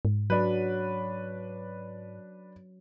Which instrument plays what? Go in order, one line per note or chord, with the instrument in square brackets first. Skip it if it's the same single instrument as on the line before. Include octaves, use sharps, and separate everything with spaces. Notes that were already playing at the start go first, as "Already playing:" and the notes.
[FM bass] G#2
[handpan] F#3 [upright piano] D4 B4